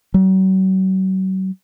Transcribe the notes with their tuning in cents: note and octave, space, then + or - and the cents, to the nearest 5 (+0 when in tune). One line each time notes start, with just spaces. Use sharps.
F#3 +40